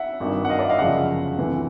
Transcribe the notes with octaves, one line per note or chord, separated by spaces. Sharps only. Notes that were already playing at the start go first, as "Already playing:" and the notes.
Already playing: E5 F#5
G#1 G2 D#3
F#5
D#5 F5
D5 E5
D#5 F5
G1 F#2 C#3 F3 E5 F#5
D2 C3 E3